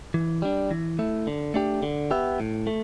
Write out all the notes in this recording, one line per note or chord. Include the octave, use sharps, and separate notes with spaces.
E3
G3 D4
E3
A3 E4
D3
A3 D4 G4
D3
B3 G4 E5
A2
A3